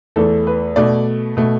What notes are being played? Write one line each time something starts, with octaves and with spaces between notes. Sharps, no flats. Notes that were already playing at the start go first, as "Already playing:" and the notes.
E2 E3 A3 A4
B4
B2 A3 D5
B2 A3